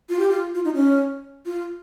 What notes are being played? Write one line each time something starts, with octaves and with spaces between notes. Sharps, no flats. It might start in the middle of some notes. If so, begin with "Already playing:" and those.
F4
G4
F4
F4
D#4
C#4
F4